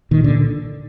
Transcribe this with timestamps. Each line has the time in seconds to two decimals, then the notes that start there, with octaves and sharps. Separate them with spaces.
0.11 A#2 D#3
0.24 A#2 D3